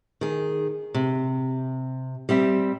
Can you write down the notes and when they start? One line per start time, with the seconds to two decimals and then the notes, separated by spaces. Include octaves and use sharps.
0.21 D#3 G#4
0.94 C3
2.29 G3 C4 E5